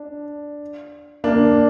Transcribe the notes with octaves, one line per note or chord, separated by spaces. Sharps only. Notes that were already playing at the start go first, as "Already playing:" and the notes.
Already playing: D4
A#3 D4